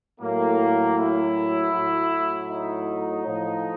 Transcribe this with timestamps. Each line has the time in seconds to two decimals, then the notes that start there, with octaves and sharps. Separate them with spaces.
0.20 A2 F#3 A#3
0.97 E4
1.73 A2 F#3
2.49 D#4
3.25 A2 F3